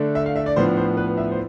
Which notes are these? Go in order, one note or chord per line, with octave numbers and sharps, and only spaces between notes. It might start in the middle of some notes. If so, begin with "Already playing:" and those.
Already playing: D3 A3 D4
E5
F5
E5
D5
A2 F3 B3 D4 C5
C5
B4
E5
C5